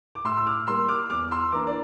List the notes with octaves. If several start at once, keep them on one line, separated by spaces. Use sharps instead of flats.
D6
A2 C6 E6
E6
D6 F6
G3 A#3 C6 E6
D6 F6
E2 D6 F6
C6 E6
E3 A#3 D4 A#5 D6
D5